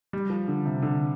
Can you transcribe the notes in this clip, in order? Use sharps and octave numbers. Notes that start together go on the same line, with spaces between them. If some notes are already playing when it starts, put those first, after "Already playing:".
G3
F3
D3
C3
D3